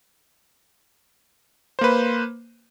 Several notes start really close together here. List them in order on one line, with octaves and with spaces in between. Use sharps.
C5 A#3 B4